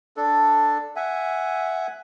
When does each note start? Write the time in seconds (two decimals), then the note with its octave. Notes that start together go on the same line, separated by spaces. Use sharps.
0.17 D4 A4
0.96 E5 F#5 G#5